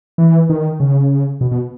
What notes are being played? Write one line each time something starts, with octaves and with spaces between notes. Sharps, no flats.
E3
D#3
C#3
B2
B2